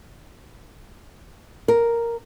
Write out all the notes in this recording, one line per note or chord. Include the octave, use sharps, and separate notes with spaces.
A#4